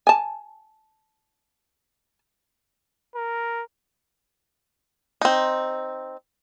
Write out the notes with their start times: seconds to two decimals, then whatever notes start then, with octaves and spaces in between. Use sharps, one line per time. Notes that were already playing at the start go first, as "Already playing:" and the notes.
0.07 G#5 A5
3.16 A#4
5.21 C4 D#4